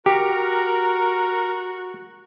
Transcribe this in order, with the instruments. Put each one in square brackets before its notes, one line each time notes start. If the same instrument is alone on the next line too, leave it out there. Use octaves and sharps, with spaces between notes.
[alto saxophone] F#4 [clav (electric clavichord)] G4 [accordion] A#4 A#5